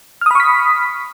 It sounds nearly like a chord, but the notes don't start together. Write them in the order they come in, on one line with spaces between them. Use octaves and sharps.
F6 D#6 B5 C#6 B6